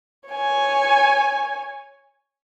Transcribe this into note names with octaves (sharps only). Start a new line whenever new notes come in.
C#5 G#5